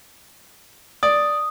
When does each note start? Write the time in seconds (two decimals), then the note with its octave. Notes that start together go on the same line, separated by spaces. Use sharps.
1.03 D5 D#6